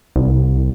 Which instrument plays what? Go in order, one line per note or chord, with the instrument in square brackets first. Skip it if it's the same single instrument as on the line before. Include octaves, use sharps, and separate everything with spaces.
[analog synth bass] C2